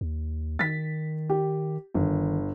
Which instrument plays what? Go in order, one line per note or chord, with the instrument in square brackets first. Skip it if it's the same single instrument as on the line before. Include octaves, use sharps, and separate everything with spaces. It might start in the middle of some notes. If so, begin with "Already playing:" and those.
[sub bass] D#2
[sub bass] D#3 [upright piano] A6 B6
[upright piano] G4
[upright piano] G1 [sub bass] D#3